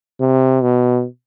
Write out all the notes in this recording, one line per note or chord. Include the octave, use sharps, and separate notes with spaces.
C3
B2